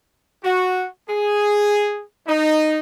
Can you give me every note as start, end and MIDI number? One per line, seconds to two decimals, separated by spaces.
0.43 0.86 66
1.09 2.03 68
2.27 2.80 63